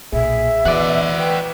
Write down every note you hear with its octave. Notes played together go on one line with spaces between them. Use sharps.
B1 A#2 G#4 E5
B2 E3 F#4 D5
B4 G5